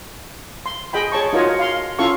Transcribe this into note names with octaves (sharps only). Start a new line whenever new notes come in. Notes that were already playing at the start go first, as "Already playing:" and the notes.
C6
G#4 D#5 G5 B5
G#4 C#5 A5 C#6
D#4 F4 F#4 A#4 C#5 D#5
F5 C6
C#4 E4 F4 A4 F5 C#6